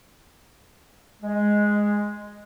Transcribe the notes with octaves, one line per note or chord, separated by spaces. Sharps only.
G#3